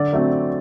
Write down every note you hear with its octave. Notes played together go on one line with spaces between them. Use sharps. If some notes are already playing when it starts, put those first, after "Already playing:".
Already playing: D3 D5
F#3 A3 C4